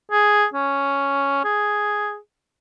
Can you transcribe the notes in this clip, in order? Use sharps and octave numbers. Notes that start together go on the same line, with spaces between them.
G#4
C#4
G#4